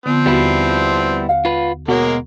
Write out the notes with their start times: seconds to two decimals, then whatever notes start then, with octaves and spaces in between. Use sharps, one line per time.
0.06 D3 F3 B3 C4
0.26 D#2 G3 B3 E4 F#4
1.29 F5 F#5
1.45 F4 B4
1.88 B2 G#3 A#3 F#4 A#4 C#5